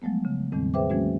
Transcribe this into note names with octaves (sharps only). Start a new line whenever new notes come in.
F3 F#3 G#3 A3 B3
C#3
E2 A2 D#3 G3 C4
G#4 B4 C5 E5 G5 D6
E3 F#3 G#3 A#3 C#4 F#4